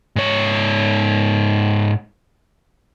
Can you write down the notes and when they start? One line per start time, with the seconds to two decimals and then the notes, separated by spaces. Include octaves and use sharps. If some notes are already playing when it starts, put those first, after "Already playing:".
0.16 G#2 C#5